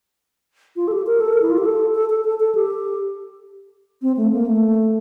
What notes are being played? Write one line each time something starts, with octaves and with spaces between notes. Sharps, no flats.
F4
A4
G4
A#4
A4
A#4
E4
F4
G4
A4
A4
A4
A4
A4
G4
C4
A3
A#3
A3